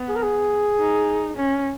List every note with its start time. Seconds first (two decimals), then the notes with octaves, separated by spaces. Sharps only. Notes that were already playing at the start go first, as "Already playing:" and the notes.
Already playing: B3
0.08 G#4
0.16 A#4
0.23 G#4
0.79 D#4
1.36 C#4